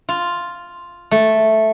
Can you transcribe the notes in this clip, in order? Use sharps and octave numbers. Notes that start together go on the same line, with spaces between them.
F4
A3